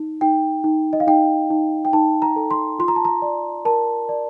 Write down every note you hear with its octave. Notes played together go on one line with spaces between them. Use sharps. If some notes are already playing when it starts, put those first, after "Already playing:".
Already playing: D#4
D#4 G5
D#4
D#5
F5
D#4 G5
D#4
G5
D#4 A5
A#5
A4
C6
F4 C6
A#5
A5
A#5
D5
A#4 A5
D5